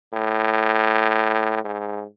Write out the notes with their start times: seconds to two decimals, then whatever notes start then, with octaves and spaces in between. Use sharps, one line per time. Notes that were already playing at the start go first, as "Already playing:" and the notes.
0.13 A2
1.64 G#2